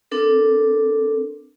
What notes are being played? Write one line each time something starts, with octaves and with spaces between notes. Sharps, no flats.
C4 D4 A4 A#4